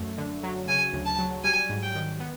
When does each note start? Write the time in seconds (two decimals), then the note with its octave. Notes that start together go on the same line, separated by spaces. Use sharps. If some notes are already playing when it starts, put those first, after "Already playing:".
Already playing: F#2 A3
0.18 D3
0.43 F#3
0.68 C#3 G#5
0.93 D2
1.06 A5
1.19 F#3
1.44 G3 G#5
1.69 G#2
1.83 G5
1.95 D#3
2.20 B3